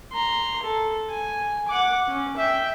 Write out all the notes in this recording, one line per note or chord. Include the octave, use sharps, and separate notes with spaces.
A#5 C6
A4
G#5
F#5 D6
C#4
E5 G5